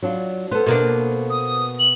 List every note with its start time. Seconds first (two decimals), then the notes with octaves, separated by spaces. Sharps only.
0.03 F#3 D4 F4
0.52 B3 A4 C5
0.66 B2 A#3 D4
1.30 D#6
1.79 F#7